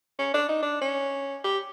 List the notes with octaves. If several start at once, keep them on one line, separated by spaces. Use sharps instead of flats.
C#4
D4
D#4
D4
C#4
G4